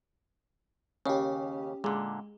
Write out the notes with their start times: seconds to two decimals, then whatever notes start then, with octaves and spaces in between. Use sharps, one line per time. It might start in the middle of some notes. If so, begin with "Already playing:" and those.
1.06 D#2 C#3 C#4 G4
1.84 A#2 D3 G#3